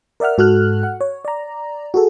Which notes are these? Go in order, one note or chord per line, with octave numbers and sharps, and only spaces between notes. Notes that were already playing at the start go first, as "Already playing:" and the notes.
A#4 D5 E5 F#5 F6
G#2 F#4 A4 F6 F#6
F#5
C#5
D5 A#5
F#4 G#4 A4